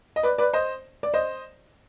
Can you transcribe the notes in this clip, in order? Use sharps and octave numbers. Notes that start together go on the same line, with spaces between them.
D#5
B4 D5
B4 D5
C5 D#5
D5
C5 D#5